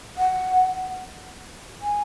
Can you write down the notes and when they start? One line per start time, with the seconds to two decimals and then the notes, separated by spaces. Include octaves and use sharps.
0.18 F#5
1.82 G#5